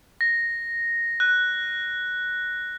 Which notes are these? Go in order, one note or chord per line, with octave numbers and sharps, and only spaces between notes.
A#6
F#6